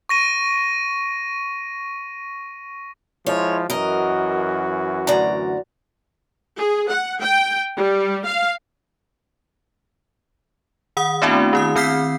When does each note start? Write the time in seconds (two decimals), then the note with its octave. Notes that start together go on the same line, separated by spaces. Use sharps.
0.09 C#6 A#6 D#7
3.26 F3 G#3 E4 C#5
3.70 F#2 E3 F#4 A#4 D#5
5.07 D2 D5 A#5
6.56 G#4
6.90 F#5
7.21 G5
7.77 G3
8.26 F5
10.97 D#3 F#5 D#6
11.22 A3 B3 C4 D4 E4 F#4
11.53 D#3 E4 D#6
11.75 D#3 C4 F6 G6 B6 C7